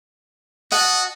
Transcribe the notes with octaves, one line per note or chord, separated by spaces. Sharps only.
F#4 D#5 F#5 A5